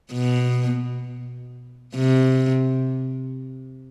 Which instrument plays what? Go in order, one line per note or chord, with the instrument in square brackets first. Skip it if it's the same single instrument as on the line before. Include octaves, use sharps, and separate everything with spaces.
[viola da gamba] B2
C3